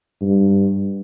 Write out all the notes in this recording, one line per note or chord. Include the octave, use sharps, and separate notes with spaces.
G2